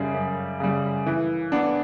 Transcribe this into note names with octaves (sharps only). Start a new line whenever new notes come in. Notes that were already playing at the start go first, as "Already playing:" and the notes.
Already playing: F#2 C#3 G3
F#2
C#3 G3
E3
B3 D4